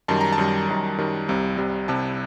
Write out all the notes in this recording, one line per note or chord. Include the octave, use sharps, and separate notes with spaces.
F#2 D#3 G3 A5
A#5
A5
F#2 D#3 G3
F#2 D#3 G3
F#2 D#3 G3
C2 C3 G3 A#5
C2 C3 G3
C2 C3 G3 A5